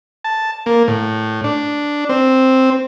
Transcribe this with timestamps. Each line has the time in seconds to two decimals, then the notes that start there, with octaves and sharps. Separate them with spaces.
0.24 A5
0.66 A#3
0.88 A2
1.44 D4
2.09 C4